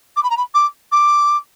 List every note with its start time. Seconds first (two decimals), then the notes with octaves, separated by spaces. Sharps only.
0.16 D6
0.23 B5
0.30 A#5
0.37 B5
0.54 D6
0.92 D6